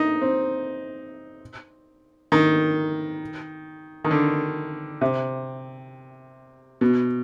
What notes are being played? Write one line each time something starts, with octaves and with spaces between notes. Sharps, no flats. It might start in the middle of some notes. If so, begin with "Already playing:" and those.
Already playing: D#4
C4
D#3
D#3
D3
C3
B2